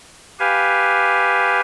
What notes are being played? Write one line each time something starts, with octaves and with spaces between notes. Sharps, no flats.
G4 B4 F5 G#5